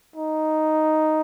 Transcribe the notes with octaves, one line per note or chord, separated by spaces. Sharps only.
D#4